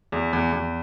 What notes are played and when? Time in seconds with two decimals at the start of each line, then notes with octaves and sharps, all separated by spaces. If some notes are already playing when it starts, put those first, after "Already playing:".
0.12 E2
0.33 E2
0.52 E2